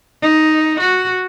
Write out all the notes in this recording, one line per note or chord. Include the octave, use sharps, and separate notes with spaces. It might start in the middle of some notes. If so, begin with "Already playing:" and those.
D#4
F#4